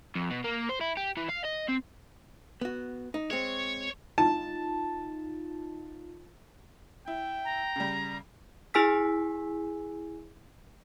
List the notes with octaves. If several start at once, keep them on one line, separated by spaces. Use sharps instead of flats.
F2
B2
A#3
C5
E4
G4
E3
F5
D#5
C4
B3 F#4
D#4
G#3 C4 C#5
D#4 F4 A5
E4 G5
A#5
C#3 G3
E4 G#4 G#5 E6 B6